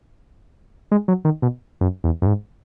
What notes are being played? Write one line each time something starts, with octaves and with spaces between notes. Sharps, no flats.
G#3
F#3
D#3
B2
F#2
E2
F#2
G#2